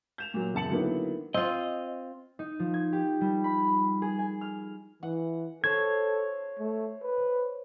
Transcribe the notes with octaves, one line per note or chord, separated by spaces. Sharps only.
G6 E7 F7
A#2 F#3
F#1 E2 A5 C#7 F#7
D3 D#3 F#3 A#3 B3 E4
C4 F4 D#5
D#4
F3
G#6
G4
G3
B5
G#4
G#5
F6
E3 F#5
A4 C5 C#5 G#6
A3
B4